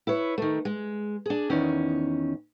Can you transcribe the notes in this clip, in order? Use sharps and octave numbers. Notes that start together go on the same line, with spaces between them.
E4 B4 C#5
D#3 A3
G#3
D4 G#4
E2 D#3 C#4